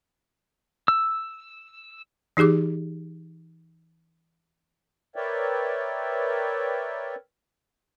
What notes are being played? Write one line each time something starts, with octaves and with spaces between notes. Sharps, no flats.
E6
E3 D#4 G4 G#4 D6
A#4 B4 C#5 D5 E5 G5